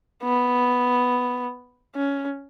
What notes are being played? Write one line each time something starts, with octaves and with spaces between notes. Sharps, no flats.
B3
C#4